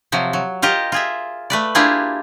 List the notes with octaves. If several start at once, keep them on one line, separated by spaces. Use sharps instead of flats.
C3 F3 F#3
F#3
F4 G4 A#4 D#5
F4 G#4 E5
A3 B4 D5
A#3 D4 E4 F4 G4 G#4